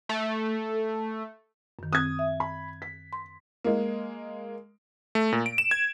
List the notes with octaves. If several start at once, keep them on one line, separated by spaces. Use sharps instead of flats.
A3
F#2 D#3
C4 D#6 F#6 G#6
E5
B5
B6
C6
G#3 A#3
A3
A#2
D7
E7
G#6